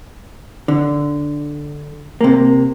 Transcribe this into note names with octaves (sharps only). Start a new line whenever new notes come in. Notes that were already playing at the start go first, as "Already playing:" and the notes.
D3
C3 A#3